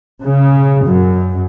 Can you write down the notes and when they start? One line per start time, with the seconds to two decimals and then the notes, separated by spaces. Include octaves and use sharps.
0.23 C#3
0.86 F#2